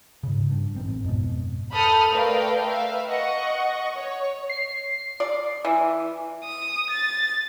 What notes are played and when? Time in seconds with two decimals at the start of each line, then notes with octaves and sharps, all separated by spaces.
0.23 G#2 C#3
0.51 G2
0.76 A1 C4
1.04 F2 G#2 B2
1.74 A4 B5 D#6 F6 G6
2.13 A3 A#4 B4 D5 F5 G5
2.68 B4 E5 F5
3.08 D#5 F#5 C#6
3.96 C#5
4.49 C7
5.20 D5
5.65 E3
6.44 D#6
6.90 A6